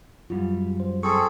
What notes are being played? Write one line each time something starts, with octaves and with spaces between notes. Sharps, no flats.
F#2 G3 F4
C5
C4 G#4 A4 C#6